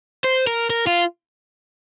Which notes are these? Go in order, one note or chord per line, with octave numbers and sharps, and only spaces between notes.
C5
A#4
A#4
F4